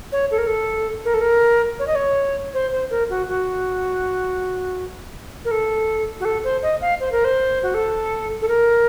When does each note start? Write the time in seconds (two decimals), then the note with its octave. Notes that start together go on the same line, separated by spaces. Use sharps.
0.12 C#5
0.31 A4
0.38 A#4
0.47 A4
1.05 A#4
1.14 A4
1.21 A#4
1.79 C#5
1.87 D#5
1.95 C#5
2.54 C5
2.72 C5
2.90 A#4
3.10 F#4
3.28 F#4
5.45 A#4
5.51 A4
6.20 F#4
6.25 A4
6.44 C5
6.63 D#5
6.81 F5
7.00 C5
7.12 A#4
7.25 C5
7.63 F#4
7.74 A4
8.42 A4
8.48 A#4